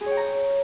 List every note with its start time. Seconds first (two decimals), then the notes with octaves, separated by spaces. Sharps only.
0.01 G#4
0.06 C#5
0.12 G5
0.17 A#5